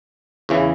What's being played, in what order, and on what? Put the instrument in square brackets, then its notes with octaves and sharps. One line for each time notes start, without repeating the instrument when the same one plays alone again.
[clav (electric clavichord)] E2 C#3 E3